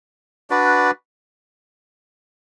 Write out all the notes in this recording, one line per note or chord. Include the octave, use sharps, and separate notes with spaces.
D4 F#4 B4 D5